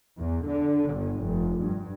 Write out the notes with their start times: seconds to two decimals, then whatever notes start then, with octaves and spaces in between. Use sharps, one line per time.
0.16 E2
0.47 D3
0.94 G1
1.24 F1
1.62 G2